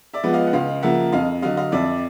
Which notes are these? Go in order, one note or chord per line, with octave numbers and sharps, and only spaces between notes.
D5 E5
F3 G#3 B3
D#5 F5
F#5
C#2 D#5 F5
C#3 F3 A#3 E5 F#5
F2 D#5 F5
D3 F#3 D#5 F5
D#5 F5
F2 D5 E5